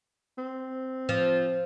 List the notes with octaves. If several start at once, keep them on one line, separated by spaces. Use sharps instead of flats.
C4
F3